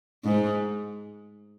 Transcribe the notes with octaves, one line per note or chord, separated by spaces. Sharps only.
G#2